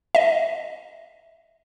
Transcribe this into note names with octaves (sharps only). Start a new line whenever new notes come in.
D#5 E5